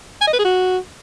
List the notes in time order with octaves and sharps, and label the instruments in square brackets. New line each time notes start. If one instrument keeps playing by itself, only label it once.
[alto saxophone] G#5
D#5
B4
G#4
F#4